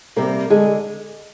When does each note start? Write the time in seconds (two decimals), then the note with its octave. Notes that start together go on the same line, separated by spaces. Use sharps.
0.16 C3 G3 A#3 A#4
0.50 D3 G#3 G#4